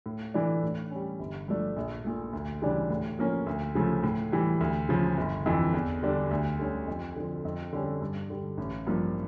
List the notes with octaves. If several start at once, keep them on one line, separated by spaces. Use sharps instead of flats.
A2
E3 A3 D4
A2
G3 C#4
G1
G2 F3 A3 D4
A#1
A#2 A3
D2
C#3 E3 G3 D4
A2
F3 A#3 C#4
D2
C#3 F3 A3
A2
E3 G3
D2
C#3 F3
G1
F2 E3
E2
D3 G3 D4
D2
D3 G3 C#4
F2
D3 F3
F2
D3 G3 C#4
G2
D3 G3
A1
G2 F3 A#3